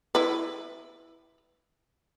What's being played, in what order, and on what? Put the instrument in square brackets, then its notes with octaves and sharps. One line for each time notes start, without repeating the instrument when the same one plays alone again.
[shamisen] E4 B4